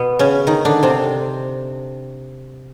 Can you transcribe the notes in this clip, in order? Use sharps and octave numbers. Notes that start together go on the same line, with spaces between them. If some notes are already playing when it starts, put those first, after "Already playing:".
Already playing: B2 B3
C#3 C#4
D#3 D#4
D3 D4
C3 C4